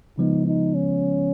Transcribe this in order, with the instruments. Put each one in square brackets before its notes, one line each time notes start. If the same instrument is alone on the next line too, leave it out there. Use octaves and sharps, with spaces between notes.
[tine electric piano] C#3 F3 G#3 B3 [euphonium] D#4
[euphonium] D#4
C#4